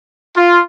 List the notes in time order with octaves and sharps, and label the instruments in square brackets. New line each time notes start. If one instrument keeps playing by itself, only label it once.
[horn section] F4